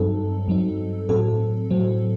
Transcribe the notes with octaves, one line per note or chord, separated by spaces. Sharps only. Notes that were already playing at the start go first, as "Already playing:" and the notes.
Already playing: G2 F#3 C4 D#4 A4
G2 F#3 C4 D#4
A2 F#3 C4 A4
A2 F#3 C4